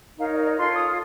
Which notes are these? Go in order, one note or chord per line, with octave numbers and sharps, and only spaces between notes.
D#4 A#4 C#5 F5
D#5
D#5
F4 A4 C#5 C6
D#6